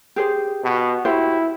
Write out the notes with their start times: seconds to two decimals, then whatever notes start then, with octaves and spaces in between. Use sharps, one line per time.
0.16 G4 G#4 C5
0.64 B2
1.05 E4 F#4 G4 C5